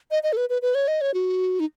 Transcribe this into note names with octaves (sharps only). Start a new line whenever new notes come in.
D#5
D#5
A4
B4
B4
B4
C#5
D#5
C#5
F#4
D#4